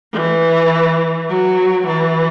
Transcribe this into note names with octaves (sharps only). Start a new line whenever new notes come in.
E3
F#3
E3